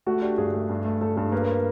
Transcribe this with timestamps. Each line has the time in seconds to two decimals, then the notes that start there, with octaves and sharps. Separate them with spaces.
0.07 A3 F#4
0.22 D4 G4
0.38 G2 G#4
0.54 A3
0.69 G2
0.85 A3
1.01 A3 A4
1.17 G2 A4
1.32 A#3 B4
1.42 A#4
1.52 B4